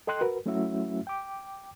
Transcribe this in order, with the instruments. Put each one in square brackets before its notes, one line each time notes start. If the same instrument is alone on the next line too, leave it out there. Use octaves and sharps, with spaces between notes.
[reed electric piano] A4 D#5 G5 C6 F#6
F#4 A#4 B4
F#3 A3 C#4 E4 F#4 E5
G5 D6